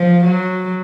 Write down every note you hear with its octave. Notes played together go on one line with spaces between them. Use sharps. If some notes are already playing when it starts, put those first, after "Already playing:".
Already playing: F3
F#3